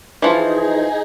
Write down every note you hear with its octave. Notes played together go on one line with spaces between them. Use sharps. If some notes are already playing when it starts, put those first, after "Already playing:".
E3 F3 D#4 F4 G#4